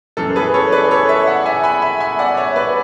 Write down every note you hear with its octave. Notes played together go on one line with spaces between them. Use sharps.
F#2 E3 A4
G#4 B4
A4 C#5
B4 D5
A4 C#5
C#5 E5
D5 F#5
E5 G#5
G#5 B5
E5 G#5
E5 G#5
D5 F#5
C#5 E5
B4 D5